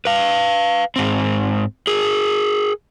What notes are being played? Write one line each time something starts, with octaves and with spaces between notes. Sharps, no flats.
B4 F5
G#2 C4
G#4 A#4